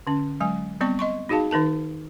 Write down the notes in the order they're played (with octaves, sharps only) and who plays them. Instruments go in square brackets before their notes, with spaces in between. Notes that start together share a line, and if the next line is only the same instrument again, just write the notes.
[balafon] D3 C#4
F#3 G#3 G#5
G3 B3 C4 D5 C#6
D#5 C6 C#6
D#4 F#4 G#4 F5 A5
D#3 D#4 A#4 A5